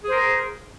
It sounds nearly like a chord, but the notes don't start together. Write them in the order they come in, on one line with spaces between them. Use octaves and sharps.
G#4 C5 A#4